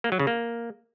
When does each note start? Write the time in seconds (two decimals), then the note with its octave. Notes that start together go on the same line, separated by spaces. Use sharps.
0.04 A#3
0.12 F#3
0.19 C#3
0.27 A#3